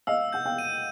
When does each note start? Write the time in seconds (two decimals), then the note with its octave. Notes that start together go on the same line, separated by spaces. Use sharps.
0.07 D#5 F5 E6
0.33 F#5 G6
0.45 F5 G5
0.59 D#7